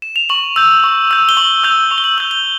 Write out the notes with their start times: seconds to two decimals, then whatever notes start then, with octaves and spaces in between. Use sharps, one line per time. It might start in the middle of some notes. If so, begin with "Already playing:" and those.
0.02 E7
0.16 F7
0.29 C#6 F#7
0.56 E6 G6
0.84 C#6
1.11 E6 G6
1.29 G7
1.37 C#6 F#7
1.64 E6 G6 F7
1.91 C#6 F7
1.98 G7
2.04 F#7
2.18 E6 G6 G7
2.31 G7